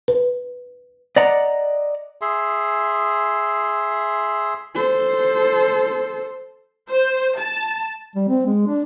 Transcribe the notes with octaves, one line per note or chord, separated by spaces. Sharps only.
B4
D5 D#5 F#5 A#5
G#4 E5 C6
A4 C5
C5
A5
G3
C4
G#3
D4